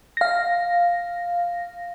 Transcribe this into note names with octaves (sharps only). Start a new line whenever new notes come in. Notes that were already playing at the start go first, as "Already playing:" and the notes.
F5 A#6